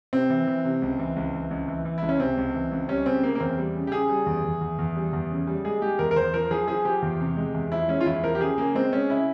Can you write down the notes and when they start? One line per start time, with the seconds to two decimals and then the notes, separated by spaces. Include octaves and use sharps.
0.13 C3 C4
0.30 E3
0.47 E3
0.65 C3
0.82 C#2
0.99 E3
1.16 C#2
1.34 E3
1.51 C#2
1.68 E3
1.85 E3
1.98 C#2 E4
2.09 C#4
2.19 C3 C4
2.37 C#2
2.54 E3
2.71 C#2
2.89 G3 C#4
3.06 C#3 C4
3.23 C#3 A#3
3.35 A#3
3.40 E2 C4
3.58 G3
3.75 C#3
3.87 G4
3.92 C#3 G#4
4.09 G3
4.26 E2
4.44 E2
4.61 E2
4.79 E2
4.96 G3
5.13 E2
5.30 C#3
5.47 G3
5.65 G#3 G#4
5.82 G#3 G4
5.99 E2 A#4
6.11 A#4
6.16 E2 C5
6.34 F3 A#4
6.51 F3 G#4
6.68 F3 G#4
6.85 F3 G4
7.02 E2
7.20 C3
7.37 G#3
7.54 E2
7.72 F3 E4
7.89 G#3 C#4
8.01 F4
8.06 E2 E4
8.23 F3 A#4
8.35 G4
8.40 C#3 G#4
8.58 C#3 A#3
8.75 G#3 C4
8.93 G#3 C#4
9.10 C#3 E4